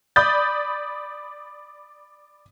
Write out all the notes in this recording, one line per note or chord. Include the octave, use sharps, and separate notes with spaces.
D5 B5 D#6 G6 A6